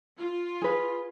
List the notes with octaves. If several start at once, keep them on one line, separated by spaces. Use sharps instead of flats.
F4
G#4 B4